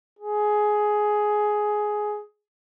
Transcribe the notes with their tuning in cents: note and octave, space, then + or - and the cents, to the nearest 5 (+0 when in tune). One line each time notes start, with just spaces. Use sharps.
G#4 +10